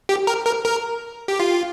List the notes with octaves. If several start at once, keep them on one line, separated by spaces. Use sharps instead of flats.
G4
A#4
A#4
A#4
G4
F4